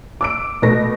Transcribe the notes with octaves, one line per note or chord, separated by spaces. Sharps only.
D6 E6 D7
B2 A3 B4 A#6